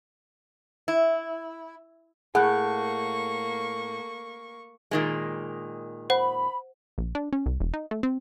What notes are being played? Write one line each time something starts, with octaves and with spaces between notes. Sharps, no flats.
E4
A2 A#3 G#4 F#5 C#6 F#6
A#2 D#3 G#3
C5 F#5 B5
A#1
D4
C#4
C2
E1
D#4
A3
C4